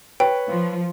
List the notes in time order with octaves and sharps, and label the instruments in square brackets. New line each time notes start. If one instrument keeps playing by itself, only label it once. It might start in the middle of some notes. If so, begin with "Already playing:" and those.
[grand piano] B4 C#5 [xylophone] G5
[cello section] F3